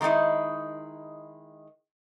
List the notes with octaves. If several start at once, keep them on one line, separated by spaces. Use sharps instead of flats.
D#3 G#3 A3 D#4 E4